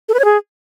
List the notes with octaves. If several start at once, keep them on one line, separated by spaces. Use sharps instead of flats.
A4
B4
C#5
G#4